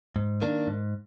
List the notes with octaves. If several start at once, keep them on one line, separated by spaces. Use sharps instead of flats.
G#2
D#3 A#3 D4
G#2